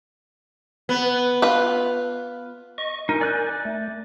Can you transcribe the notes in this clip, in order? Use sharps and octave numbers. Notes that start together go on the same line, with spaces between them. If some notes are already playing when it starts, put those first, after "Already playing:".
B3
F4 B4
D#5 C#6
D#4 A#4 G#5
D5 F#6 G6
A3